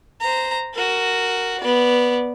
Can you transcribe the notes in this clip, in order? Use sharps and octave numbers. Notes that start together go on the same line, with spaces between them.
C5 A#5
F#4 A#4
B3 D5